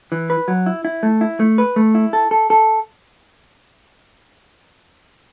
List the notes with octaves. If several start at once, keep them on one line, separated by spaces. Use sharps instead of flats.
E3
B4
F#3
E4
E4
A3
E4
A3
B4
A3
E4
A4
A4
A4